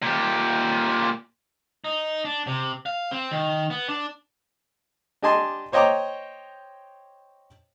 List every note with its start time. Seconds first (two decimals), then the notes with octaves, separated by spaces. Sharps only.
0.02 A#2 G4
1.84 D#4
2.25 D4
2.47 C3
2.86 F5
3.11 C4
3.31 D#3
3.70 B3
3.88 D4
5.22 D4 G4 D#5 G#5 A5 C6
5.72 C5 C#5 D#5 G5 A#5 D6